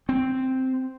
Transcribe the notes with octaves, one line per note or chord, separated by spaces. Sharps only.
C4